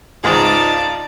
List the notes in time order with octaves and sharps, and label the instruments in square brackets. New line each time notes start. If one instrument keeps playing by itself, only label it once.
[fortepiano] G#1 C#2 G#4 [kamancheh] D#4 F4 [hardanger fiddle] D5 A5